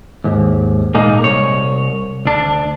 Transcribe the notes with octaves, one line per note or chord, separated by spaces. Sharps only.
D#2 G#2
A#2 G#3 A#3 D#4
C2 C#5
D2 D4